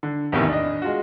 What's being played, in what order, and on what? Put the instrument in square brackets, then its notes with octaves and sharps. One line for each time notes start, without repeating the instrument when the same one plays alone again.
[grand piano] D3
A#1 E2 A2 C3 D#3
D4 D#5
G#3 F4 F#4